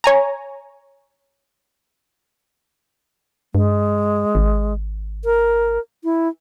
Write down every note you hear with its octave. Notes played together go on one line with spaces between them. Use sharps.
C#5 G#5 A#5
G2 G#3
G#1
A#4
E4